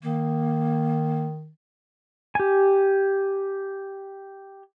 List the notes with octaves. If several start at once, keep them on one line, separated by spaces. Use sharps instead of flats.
D#3 A#3
G4 G#5